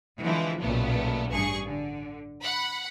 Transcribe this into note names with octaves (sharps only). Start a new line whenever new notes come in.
D3 E3 F3 G#3 E4
B1 A#2 C#3 A3 B3
A1 G2 G#4 C#6
D3
F#5 B5